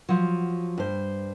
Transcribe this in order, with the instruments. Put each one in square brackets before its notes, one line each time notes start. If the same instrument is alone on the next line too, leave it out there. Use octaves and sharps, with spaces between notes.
[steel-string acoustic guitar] F3 F#3
G2 C5